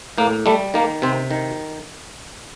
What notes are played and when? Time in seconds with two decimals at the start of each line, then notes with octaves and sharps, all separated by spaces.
0.18 A2 A#3
0.46 G3 A3
0.74 D#3 A#3
1.02 C3 C4
1.31 D#3